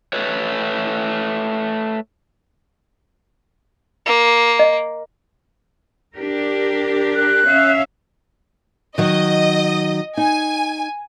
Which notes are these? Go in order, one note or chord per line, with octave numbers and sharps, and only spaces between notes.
A3 B4 C#5
A#3
D#5
D4 G4 A#4
F#6
C#4 E5 F5
D#3 F#3 D#5
D#4 G#5